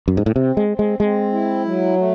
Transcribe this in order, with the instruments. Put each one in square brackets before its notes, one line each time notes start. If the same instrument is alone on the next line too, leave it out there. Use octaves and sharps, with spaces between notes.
[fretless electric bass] F#2
G#2
A2
[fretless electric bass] C3 [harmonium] C4
[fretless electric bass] G#3
[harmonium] C4
[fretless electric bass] G#3
[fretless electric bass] G#3 [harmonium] C4
[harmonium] E4
F#3
A3